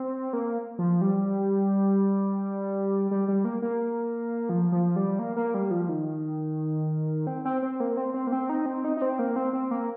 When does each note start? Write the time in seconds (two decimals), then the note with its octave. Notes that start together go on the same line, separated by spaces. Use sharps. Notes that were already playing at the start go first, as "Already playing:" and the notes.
Already playing: C4
0.33 A#3
0.79 F3
1.02 G3
3.11 G3
3.28 G3
3.45 A#3
3.62 A#3
4.49 F3
4.72 F3
4.96 G3
5.19 A#3
5.36 A#3
5.54 G3
5.71 F3
5.89 D#3
7.27 C4
7.45 C4
7.62 C4
7.80 A#3
7.97 C4
8.14 C4
8.27 A#3
8.32 C4
8.49 D#4
8.66 C4
8.84 D#4
8.97 D#4
9.02 C4
9.19 A#3
9.36 C4
9.53 C4
9.71 A#3